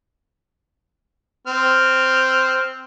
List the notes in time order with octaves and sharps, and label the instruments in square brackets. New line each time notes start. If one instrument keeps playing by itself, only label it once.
[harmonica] C4 F6